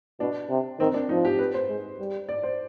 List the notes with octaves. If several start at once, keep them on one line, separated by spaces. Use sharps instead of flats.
B2 D4
C3
D#3 C4
D4
F3 D#4
G4
B4
C5
G#3
G3
D5
C5